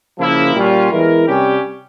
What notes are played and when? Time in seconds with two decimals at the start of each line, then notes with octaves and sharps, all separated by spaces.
0.18 C#3 F3 A#3 E4
0.55 A#2 G3 C#4 F4
0.91 E2 E3 G#3 E4 A#4
1.27 C3 G3 C#4 G4